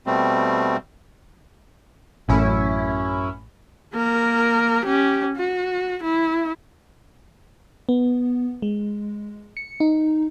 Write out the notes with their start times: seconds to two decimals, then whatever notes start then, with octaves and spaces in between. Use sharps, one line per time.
0.06 B2 G3 A3 C4
2.29 A1 F#2 A2 C#4 E4
3.94 A#3 A#4
4.85 C#4 G4
5.36 F#4
6.03 E4
7.89 B3
8.62 G#3
9.57 C#7
9.80 D#4